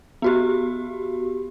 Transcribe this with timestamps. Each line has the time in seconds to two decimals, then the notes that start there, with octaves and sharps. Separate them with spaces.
0.22 B3 F#4 G4